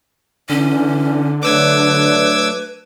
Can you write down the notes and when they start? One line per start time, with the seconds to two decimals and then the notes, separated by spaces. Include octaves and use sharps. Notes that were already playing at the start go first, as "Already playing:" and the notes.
0.49 D3 E3 C#4
1.43 F#3 A3 D4 B4 D6 E6 G#6